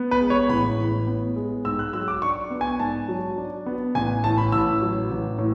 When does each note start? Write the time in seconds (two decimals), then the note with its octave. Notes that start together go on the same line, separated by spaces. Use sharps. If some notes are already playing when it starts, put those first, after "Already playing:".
Already playing: B3
0.11 B4
0.21 G#3
0.30 C#5
0.49 A1 B5
0.78 A2
1.07 B3
1.36 G#3
1.65 G#2 E6
1.79 F#6
1.93 F#3 E6
2.08 D6
2.22 D4 C#6
2.51 B3
2.61 G#5
2.80 G#2 A5
3.09 F#3
3.38 D4
3.66 B3
3.95 A1 G#5
4.24 A2 A5
4.38 B5
4.52 A1 E6
4.82 F#3
5.11 A1
5.38 A2